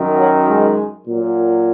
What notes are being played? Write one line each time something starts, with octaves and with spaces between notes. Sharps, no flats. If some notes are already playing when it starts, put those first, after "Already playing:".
Already playing: F#2 D#3
F#3
G#3
A#2 F#3